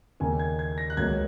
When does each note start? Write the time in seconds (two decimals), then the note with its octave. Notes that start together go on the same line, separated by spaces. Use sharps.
0.20 D#2 C#3 A#3 G#5
0.39 G#6
0.59 G#6
0.78 A#6
0.90 F#6
0.97 C#2 C#3 F#3 A#3 C#4 G#6